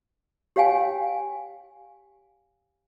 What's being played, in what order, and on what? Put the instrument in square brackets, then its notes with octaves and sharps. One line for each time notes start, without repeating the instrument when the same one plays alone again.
[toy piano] G4 C#5 F5 G5 G#5